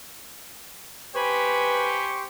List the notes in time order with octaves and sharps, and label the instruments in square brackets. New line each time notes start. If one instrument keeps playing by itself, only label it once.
[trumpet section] G4 C5 C#6 [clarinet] B4 [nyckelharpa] G#5 B5